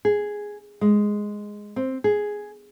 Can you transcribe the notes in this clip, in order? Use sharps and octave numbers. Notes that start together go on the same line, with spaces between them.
G#4
G#3
C4
G#4